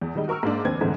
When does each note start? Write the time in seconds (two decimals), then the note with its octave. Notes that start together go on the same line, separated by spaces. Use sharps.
0.02 E2
0.15 D#3 G3 G#3 D#4
0.28 F#4 A#4 C#6 E6 F6
0.43 G#2 A#3 D4
0.64 F1 D#2 C4 D4 B4 G#6
0.80 C2 G#2 D3 E3 F3